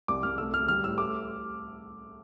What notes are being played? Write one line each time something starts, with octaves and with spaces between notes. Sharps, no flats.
C2 D6
C2 F6
A3 E6
D2 F6
G3 F6
A2 E6
A3 D6